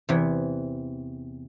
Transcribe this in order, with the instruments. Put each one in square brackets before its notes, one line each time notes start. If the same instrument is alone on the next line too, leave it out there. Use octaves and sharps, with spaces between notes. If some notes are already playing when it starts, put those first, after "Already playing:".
[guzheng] E2 C3 E3